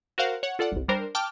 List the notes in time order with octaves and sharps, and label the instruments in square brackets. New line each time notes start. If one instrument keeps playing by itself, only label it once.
[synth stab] F#4 A#4 C5 F5 F#5
C#5 F#5
F4 A4 D5 F#5
G1 C2
G3 D4 A#4 C5
G5 A5 D6 F6